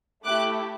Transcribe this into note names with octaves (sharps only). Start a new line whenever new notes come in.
A3 E4 G4 D6 F#6